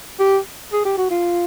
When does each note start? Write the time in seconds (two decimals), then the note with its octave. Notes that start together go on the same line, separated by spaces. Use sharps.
0.19 G4
0.73 G#4
0.85 G4
0.98 F#4
1.11 F4